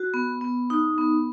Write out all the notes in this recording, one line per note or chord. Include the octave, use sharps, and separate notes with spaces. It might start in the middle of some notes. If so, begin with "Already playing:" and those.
Already playing: F#4
B3
B3
D#4
B3